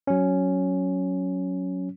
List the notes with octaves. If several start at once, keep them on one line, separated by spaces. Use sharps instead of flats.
F#3 C#4